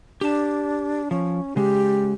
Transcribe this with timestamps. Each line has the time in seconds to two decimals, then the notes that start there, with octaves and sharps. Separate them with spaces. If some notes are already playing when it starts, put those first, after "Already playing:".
0.21 D4 G4 A5
1.11 F3 C#4
1.56 C#3 G#3 G4